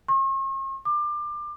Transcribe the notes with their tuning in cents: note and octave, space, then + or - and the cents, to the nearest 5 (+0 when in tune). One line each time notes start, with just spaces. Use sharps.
C#6 -45
D6 +25